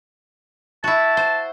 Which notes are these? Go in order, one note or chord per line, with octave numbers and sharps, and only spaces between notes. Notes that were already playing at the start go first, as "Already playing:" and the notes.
E4 F#4 A5
C5